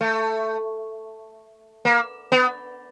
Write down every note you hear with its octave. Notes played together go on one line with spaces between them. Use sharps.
A3
A#3
B3